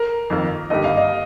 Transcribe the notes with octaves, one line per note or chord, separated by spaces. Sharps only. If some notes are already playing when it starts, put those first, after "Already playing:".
Already playing: A#4
F2 D#3 A#3
G1 G2 D#3 A#3 G4 D#5
F5
D#5